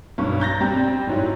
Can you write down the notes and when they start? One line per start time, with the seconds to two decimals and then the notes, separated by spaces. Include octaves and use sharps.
0.18 B1 G2 C#6
0.40 A#5 G6 A6 A#6
0.61 G3 C4
1.07 G#2 F#3 E4